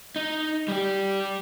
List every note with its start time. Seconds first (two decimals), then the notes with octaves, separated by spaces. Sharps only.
0.16 D#4
0.68 G3 G4